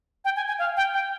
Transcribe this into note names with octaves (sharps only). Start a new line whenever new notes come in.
G5
G#5
G#5
F5
G5
G5